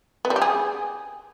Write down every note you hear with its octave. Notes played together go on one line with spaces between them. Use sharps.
B3
G3
G4
G#4